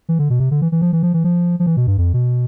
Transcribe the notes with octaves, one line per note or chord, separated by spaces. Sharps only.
E3
D3
B2
C3
D3
E3
E3
F3
E3
F3
E3
F3
F3
E3
B2
G2
F2
B2